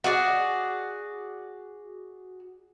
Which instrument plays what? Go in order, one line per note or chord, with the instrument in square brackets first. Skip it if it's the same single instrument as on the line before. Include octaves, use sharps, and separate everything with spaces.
[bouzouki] F#4 G#4 D5